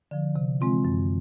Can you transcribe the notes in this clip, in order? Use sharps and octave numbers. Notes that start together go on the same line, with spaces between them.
D3 F3
C3
E3 G#3 C4 F4
F#2